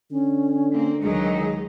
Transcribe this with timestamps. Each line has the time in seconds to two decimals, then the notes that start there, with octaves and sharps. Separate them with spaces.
0.11 D3 C#4
0.73 A#3 C4
1.03 C#2 D#3 F#3 G#3 D#4 G#4